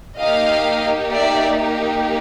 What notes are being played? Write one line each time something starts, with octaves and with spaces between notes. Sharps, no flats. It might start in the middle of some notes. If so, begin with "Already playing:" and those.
A#3 D#4 G4 D#5 F5
D5 E5